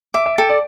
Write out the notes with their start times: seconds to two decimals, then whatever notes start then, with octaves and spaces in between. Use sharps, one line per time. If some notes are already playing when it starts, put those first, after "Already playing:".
0.14 E5 D6
0.26 E5
0.38 A4 G5
0.49 D5